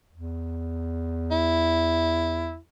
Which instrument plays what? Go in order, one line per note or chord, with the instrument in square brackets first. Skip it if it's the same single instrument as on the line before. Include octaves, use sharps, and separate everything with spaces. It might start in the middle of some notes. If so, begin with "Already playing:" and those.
[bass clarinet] E2
[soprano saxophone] E4